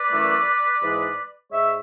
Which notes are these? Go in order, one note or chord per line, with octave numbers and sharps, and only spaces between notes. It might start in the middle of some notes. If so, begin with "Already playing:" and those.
Already playing: B4 D5
F#2 E3 A3
G#2 E3 G#3
G#2 G#3 C#5 E5